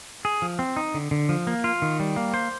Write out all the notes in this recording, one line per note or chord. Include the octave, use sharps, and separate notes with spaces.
G#4
F3
C4
D#4
D3
D3
F3
A#3
F4
D#3
G3
A#3
C5